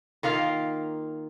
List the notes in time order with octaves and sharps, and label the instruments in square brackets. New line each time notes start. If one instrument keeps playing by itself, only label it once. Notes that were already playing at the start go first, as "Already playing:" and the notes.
[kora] D#3 A#3 F4 F5